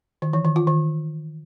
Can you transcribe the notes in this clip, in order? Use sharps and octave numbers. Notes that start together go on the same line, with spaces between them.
D#3
E3
D#3
F4
D#3